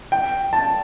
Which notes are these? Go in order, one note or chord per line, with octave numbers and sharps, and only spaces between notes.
G5
A5